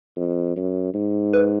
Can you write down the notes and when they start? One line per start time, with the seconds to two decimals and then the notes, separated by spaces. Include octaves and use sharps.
0.17 F2
0.56 F#2
0.94 G#2
1.33 B4